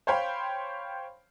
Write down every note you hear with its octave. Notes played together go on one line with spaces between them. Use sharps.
C5 C#5 F5 G5 B5 C6